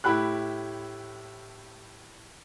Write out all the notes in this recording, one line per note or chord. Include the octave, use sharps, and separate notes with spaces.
A2 E4 G4 B5 F#6